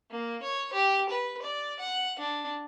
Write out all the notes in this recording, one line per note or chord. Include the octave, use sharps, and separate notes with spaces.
A#3
C#5
G4
B4
D5
F#5
D4